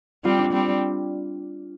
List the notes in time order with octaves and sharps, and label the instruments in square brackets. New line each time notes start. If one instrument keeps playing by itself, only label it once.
[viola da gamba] G3 C4 [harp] F4
[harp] D4
[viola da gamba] G3 C4